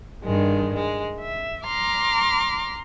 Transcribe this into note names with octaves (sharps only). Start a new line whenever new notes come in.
G2 D#3 G#3
G#3
E5
A#5 C6 D6 F6